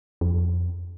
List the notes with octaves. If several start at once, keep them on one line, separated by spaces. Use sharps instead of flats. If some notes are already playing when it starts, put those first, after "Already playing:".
F2